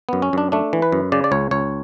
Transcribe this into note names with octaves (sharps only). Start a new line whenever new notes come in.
F#2 B3
C#4
F#2 D4
A3 D4
E3
B4
F#2
C#3 D5
D5
C#2 C#5
C#2 C#5